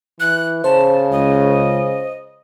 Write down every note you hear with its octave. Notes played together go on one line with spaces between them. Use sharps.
E3 F#6
C#3 C5 A5
C#2 D#5